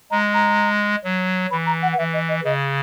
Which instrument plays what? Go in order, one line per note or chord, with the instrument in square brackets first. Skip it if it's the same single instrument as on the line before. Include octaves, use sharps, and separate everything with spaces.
[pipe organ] G#3 [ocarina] A#5
[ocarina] A#5
[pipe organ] F#3
[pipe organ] E3 [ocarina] B5
[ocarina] A#5
F#5
F#5
[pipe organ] E3 [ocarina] E5
[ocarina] D#5
D#5
[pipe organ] C#3 [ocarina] D#5